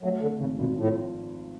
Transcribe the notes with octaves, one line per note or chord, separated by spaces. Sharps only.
F#3 A3
D3 A3
G#1 C#3
G#1 B2
A2 F3